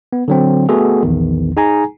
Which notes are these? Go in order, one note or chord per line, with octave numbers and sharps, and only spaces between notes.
B3
D3 F#3 C4
A3 B3 F#4 G#4 A4
A#1 E2 D#3
D#4 G#4 G#5 A#5